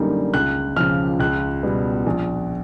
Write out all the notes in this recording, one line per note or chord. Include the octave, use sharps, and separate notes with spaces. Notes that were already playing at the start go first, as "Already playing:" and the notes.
Already playing: F#2 D3 G3 A#3 D#4
C#2 F#6
C#3 F3 F6
C#2 F#6
B2 G3 B3
A#1